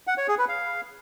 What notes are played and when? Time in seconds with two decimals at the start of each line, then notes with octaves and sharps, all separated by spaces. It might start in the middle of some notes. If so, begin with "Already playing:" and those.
0.07 F#5
0.18 C#5
0.28 G#4
0.38 B4
0.49 F5